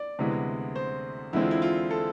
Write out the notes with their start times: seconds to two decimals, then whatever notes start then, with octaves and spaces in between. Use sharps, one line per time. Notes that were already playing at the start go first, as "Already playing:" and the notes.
Already playing: D5
0.19 D2 C3 E3 G#3 B3
0.76 C5
1.33 E2 D3 G#3 C4 E4
1.42 F4
1.51 E4
1.62 F4
1.91 A4